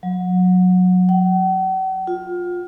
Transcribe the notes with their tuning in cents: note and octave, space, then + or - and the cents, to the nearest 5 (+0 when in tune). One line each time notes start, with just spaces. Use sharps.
F#3 -25
F#5 +45
F4 +20